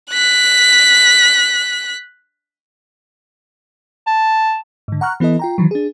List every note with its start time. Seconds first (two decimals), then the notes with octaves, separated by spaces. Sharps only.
0.11 F#6 B6
4.07 A5
4.88 G#2 D3
5.01 F#5 A#5 C#6 F6 F#6
5.20 E3 B3 E4 A4 D#5
5.39 F4 G5 A#5
5.58 D#3 E3 F#3
5.71 D4 G#4